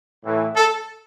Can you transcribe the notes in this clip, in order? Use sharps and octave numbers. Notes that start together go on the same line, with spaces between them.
A2 E3
A4